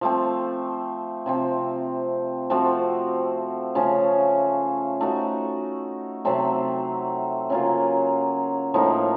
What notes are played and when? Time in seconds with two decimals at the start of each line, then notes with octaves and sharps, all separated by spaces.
0.01 F3 A3 C4
1.26 C3 F3 C4
2.50 F3 A3 C4 F#4
3.75 C#3 F3 A3 C#4
5.01 A3 D#4 F#4
6.25 C3 F#3 A3 C4
7.50 C#3 F#3 A#3 F4
8.74 A2 F3 A#3 D#4